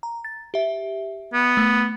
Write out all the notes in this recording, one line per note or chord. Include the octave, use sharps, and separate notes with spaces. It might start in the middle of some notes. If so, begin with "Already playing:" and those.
A#5
A6
G4 E5
B3
A3